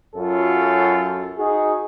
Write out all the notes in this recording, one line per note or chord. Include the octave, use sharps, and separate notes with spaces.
F#2 F#3 F4 A4
D#4 F#4 G#4